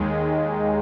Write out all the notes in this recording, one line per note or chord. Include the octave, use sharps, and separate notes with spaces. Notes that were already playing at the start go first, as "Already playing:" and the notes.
Already playing: D#2 D#3 G#3